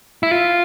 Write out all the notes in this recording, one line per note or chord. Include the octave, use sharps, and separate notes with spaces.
E4
F4